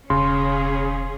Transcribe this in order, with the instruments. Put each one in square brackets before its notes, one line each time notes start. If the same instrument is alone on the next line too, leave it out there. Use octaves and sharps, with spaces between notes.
[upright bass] E1 [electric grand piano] C#3 [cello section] C#4 G#4 [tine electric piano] C6